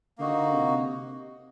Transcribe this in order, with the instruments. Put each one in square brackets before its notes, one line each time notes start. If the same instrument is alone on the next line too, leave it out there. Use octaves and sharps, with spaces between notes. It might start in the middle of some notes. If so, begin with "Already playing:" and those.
[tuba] D3 [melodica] A#3 D#4 F#4
[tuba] C3